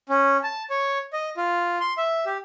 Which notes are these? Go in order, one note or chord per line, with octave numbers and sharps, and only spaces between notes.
C#4
A5
C#5
D#5
F4
C6
E5
G4